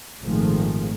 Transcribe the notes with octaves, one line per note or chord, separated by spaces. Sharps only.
G#1 A#2 D#3 F3 G#3 A3